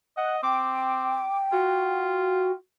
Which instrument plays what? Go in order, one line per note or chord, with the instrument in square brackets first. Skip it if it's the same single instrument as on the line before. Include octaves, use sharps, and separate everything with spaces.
[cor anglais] D#5 [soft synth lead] F#5
[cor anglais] C4 [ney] G5 [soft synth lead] D6
[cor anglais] F4 [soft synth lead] F#4